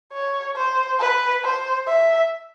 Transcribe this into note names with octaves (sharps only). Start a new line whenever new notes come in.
C#5
C5
B4
C5
E5